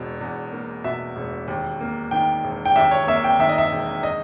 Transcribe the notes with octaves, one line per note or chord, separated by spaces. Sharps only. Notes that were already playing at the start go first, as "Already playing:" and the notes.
Already playing: E1 B2
E2
A#3
B2 E5
E1
D#2
A#3
D#3 G5
E1
G5
D#2 E5
C#5
A#3 E5
G5
D#3 E5
D#5
E5
E1
D#5